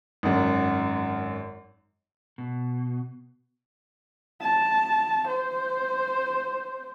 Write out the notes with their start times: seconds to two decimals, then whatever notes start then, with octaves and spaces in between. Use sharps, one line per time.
0.23 G#1 F#2
2.38 B2
4.41 A5
5.28 C5